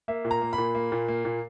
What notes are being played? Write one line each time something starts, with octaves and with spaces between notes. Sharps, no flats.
A#3 E5
A#2
A#5
A#3
B5
A#2
A#3
A#2
A#3
A#2